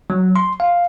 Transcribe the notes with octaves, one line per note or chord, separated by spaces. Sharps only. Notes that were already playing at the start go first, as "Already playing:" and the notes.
F#3
C6
F5